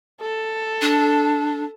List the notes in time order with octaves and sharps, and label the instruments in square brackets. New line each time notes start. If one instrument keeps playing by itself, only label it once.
[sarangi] A4
[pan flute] D4